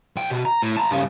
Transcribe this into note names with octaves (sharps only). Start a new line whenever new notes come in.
B1 G5
B2
A#5
A2
A5 A#5
G2 C#3